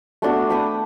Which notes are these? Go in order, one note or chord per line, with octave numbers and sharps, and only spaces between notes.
A3 B3 D4 F#4
G5 B5 D6 D#6